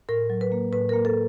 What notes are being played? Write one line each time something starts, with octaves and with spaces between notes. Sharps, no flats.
A2 A#4
F#3
B4
A#3
A2 B4
A#4
A#3
A4